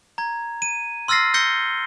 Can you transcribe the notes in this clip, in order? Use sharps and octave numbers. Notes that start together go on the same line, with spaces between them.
A#5 G#6
D#7
C6 E6 F6 A6 A#6 C7
E6 G6 A#6 C#7 G7